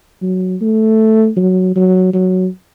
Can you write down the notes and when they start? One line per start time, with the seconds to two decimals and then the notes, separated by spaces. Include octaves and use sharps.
0.22 F#3
0.61 A3
1.37 F#3
1.76 F#3
2.13 F#3